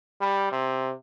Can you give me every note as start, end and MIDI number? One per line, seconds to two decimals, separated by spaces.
0.21 0.51 55
0.52 0.93 48